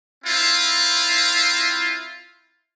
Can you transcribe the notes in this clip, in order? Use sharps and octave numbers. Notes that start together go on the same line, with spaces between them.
C4 E4 F4